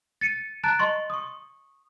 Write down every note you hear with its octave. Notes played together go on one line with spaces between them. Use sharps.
A6 C#7 D#7
A5 A#5 F#6 A6 D7
D#5 C6 C#6 A6
C#6 D#6